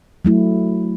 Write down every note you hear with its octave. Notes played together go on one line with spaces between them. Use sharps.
F#3 A3 E4